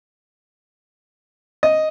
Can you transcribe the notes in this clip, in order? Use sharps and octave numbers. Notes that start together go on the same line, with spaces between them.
D#5